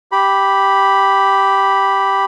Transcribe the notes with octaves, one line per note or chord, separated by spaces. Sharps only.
G4 B5